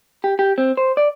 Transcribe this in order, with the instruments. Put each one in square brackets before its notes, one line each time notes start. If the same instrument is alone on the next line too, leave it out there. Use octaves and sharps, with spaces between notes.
[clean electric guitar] G4
G4
C4
C5
D5